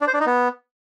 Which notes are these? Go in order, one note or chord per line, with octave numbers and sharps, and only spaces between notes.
D4
C5
D4
D#4
B3